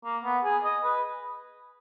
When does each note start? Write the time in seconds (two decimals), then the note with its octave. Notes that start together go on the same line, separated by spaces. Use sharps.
0.05 A#3
0.24 B3
0.44 G#4
0.64 D#5
0.84 B4